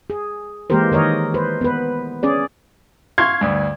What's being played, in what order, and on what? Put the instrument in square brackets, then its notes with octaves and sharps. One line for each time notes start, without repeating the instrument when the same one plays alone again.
[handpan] G#4
E3 G#3 A#3 G4 A#4 C5
D#3 A#4 C#5 D#5
B4 C5
B3 B4
C#4 G#4 D5
[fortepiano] F5 C6 C#6 [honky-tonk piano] G#6
[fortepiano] D2 G2